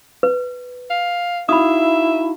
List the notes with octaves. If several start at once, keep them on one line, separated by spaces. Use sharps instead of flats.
B4
F5
D#4 E4 F#4 E5 F5 B5 D#6